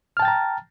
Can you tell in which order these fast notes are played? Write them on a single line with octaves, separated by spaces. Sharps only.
F6 A5 G5 A6 A#5